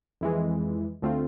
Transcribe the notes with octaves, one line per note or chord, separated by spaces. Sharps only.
F2 E3 G#3
D2 D3 A3 C4 F4